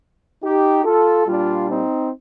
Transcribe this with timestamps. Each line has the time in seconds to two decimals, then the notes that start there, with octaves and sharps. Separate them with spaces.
0.44 D#4 G4
0.85 F4 A4
1.27 A#2 G3 D4 F4
1.68 C4 D#4